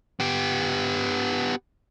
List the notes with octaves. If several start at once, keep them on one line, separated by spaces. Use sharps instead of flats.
B3 G4